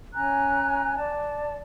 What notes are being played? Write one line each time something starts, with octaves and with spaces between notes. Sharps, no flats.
C#4 G#5 A#5 F#6
D5 A5